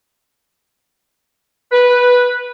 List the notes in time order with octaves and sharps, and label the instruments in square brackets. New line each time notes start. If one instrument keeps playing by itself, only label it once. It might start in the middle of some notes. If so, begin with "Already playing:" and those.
[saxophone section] B4